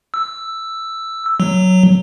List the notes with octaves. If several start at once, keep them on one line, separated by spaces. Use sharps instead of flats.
E6
F#3